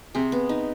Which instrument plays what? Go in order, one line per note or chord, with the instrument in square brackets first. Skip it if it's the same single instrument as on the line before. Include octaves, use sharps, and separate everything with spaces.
[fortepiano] C3 [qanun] G#4
[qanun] B3
D#4